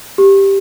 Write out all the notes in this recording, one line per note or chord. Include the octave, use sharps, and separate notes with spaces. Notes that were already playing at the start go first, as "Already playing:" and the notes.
G4